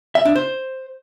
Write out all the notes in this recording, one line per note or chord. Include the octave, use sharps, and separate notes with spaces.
E5
D4
C5